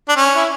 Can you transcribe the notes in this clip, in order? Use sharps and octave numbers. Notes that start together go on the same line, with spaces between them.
D4
C#4
E4